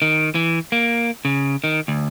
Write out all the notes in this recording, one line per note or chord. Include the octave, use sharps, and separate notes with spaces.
D#3
E3
A#3
C#3
D#3
D2